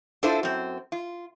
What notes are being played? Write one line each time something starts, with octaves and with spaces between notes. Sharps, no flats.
D4 E4 F4 A4 C5
F#2 C4
F4